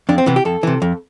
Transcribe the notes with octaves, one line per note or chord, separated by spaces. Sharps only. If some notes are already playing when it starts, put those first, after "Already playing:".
F2 D4
C4
C3 E3 B3
G4
F2 A4
C3 E3
F2